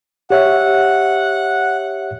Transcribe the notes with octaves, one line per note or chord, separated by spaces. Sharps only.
G4 C#5 E5 F#5